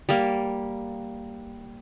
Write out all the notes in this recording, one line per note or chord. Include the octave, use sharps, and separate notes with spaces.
G3 A#3